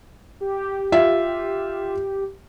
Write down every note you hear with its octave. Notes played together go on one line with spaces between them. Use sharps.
G4
F4 E5